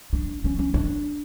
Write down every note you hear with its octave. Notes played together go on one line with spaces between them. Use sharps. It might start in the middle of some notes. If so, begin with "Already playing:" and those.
D4
C#4
C#4
D4